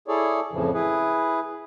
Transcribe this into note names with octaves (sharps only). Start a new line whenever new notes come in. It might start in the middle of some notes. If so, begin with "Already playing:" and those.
E4 G#4 A4 C#5 D5
F2 A2 C#3 E3 F3
E4 G#4 B4